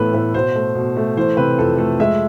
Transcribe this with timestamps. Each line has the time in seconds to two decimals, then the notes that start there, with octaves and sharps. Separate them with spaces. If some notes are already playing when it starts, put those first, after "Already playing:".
Already playing: A2 E3 B3 A4 B4
0.13 A2 B4
0.34 B2 C5
0.55 A3
0.75 B2
0.97 A3
1.17 E3 C5
1.37 C3 B4
1.58 F2 A4
1.78 A3 A4
2.00 G#3 E5